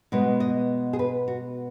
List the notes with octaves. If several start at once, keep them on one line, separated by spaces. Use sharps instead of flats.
B2 G#3 B3 B4
D#5
G#4
B4
F#4